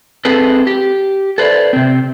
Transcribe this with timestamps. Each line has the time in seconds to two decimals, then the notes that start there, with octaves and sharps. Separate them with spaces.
0.25 C4 G#4 A4 B4
0.67 G4
1.38 A4 B4 C5 D5
1.73 C3 C4